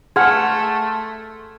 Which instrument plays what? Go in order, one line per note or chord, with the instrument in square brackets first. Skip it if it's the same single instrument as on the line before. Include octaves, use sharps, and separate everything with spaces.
[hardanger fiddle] A3 [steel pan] G#4 F#5 [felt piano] C6 F6 [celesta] G#6